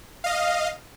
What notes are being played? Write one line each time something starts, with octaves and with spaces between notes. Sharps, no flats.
D#5 F5